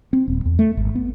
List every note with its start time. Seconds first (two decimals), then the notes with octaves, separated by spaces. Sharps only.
0.13 C4
0.28 D#1
0.45 E2
0.59 A3
0.77 G#1
0.95 B3